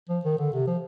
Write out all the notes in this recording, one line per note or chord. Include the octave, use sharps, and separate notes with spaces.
F3
D#3
D3
C3
F3